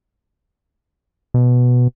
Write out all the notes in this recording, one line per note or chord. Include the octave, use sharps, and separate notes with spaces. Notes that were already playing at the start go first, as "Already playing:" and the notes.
B2